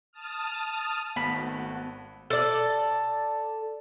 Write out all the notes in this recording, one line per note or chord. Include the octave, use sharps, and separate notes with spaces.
A5 D#6 F6
G#1 A3 B3 F#4 B5
A4 D5